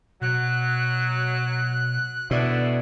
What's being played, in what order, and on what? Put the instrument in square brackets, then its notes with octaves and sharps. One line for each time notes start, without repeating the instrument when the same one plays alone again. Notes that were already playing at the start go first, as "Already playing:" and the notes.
[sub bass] B2 [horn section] F#3 [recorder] F#6
[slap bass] B2 [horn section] A3 D4 E4 [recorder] D5